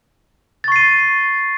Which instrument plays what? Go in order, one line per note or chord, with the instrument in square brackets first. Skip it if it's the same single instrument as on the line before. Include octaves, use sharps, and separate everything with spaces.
[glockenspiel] A6
C#6
C7
D#7